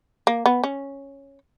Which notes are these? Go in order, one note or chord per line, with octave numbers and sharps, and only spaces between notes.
A#3
B3
C#4